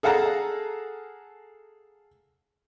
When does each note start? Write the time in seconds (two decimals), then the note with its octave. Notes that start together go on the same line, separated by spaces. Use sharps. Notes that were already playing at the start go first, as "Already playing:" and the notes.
0.03 G#4 A4 F5 F#5 A5 A#5